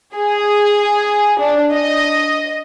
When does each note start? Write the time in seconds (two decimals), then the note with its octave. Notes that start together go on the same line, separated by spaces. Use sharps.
0.16 G#4
1.40 D4
1.74 D#5